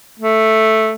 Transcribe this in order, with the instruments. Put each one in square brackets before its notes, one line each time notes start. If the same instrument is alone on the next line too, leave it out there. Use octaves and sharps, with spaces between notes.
[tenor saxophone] A3